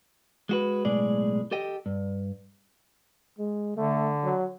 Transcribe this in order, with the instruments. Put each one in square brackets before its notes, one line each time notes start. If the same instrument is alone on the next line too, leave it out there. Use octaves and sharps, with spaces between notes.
[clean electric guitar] G#3 F#4 B4
B1 A2 G#3 G#4 D5
G4 A4 D#5 G5
G2
[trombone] G#3
[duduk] D3 [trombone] A3
[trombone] F#3